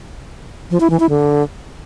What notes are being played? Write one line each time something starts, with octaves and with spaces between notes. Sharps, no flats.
F3
E4
E3
E4
D3